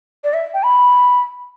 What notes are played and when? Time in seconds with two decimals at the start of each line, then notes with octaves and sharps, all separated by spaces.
0.24 D5
0.34 E5
0.54 G5
0.64 B5